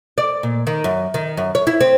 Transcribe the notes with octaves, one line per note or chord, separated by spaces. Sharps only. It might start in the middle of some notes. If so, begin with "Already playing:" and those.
D5
A#2
D#3
F#2
D#3
F#2
C#5
E4
C4